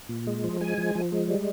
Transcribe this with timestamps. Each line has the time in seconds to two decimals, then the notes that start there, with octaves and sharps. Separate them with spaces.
0.09 A#2
0.27 G#3
0.44 F3
0.61 G#3 G#5
0.78 F3
0.95 F3
1.12 G#3
1.28 G3